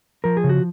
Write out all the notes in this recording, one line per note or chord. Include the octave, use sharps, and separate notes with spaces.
F3 A#4
G#4
C#3
F#4